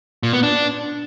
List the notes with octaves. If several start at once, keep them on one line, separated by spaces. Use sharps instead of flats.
A#2
B3
D4